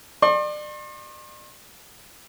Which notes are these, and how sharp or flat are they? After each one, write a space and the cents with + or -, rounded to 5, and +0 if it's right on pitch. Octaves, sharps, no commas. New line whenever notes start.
D5 +35 C6 +45